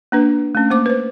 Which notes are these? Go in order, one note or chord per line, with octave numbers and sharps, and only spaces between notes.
A#3 D4 B4
A3 C#4
A#3 C5 D6
B4 C5